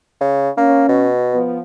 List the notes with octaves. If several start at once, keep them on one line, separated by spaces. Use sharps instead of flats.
C#3
A#3 C#4
B2
F3 B3